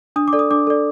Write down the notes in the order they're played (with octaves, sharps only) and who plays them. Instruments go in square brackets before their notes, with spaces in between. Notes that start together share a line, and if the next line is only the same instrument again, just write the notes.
[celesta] D4 D#6
D6
A4 D5
D#6
D4 D6
A4 D5